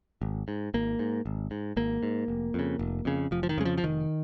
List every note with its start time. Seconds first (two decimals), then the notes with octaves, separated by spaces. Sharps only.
0.22 G#1
0.48 G#2
0.74 G#1 A#3
0.99 G#2
1.26 G#1
1.51 G#2
1.77 G#1 A#3
2.03 G#2
2.28 F1
2.54 F2 C#3
2.79 F1
3.05 F2 C#3
3.31 F1 F3
3.43 F3
3.49 D#3
3.58 F2 C#3 G#3
3.65 F3
3.77 F3
3.83 F1 D#3